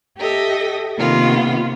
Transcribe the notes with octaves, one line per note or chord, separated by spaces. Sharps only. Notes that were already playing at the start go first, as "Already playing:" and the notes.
G4 A4 D#5 E5
C3 D#3 A#3 B3 F4